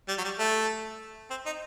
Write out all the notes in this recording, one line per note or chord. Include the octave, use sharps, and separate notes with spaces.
G3
F#3
G3
A3
C4
D#4